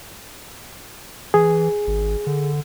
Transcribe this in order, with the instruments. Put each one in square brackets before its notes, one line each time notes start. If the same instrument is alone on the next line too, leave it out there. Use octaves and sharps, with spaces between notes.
[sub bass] E3 [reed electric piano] G#4
[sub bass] G#1
D3